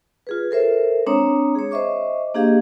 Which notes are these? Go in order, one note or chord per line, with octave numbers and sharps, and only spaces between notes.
F4 G#4 B4
A4 A#4 C5 E5
G#3 C4 D4 C#5 A#5 D#6
G#4 C#5
C5 D#5 E5 C#6 D6
A#3 D4 G4 G#4 D#5 F5